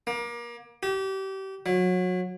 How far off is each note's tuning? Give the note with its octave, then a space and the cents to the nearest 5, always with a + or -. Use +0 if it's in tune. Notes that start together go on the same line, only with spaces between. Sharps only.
A#3 +30
G4 -30
F#3 -25